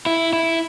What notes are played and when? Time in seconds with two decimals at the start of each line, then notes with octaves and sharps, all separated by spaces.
0.06 E4
0.33 E4